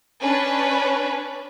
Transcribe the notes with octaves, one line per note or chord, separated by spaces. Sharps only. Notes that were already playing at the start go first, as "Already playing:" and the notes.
C#4 D4 B4